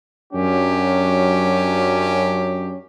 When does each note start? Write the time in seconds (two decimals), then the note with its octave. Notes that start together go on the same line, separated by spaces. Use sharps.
0.32 F#2 F#3 C#4 D4 G4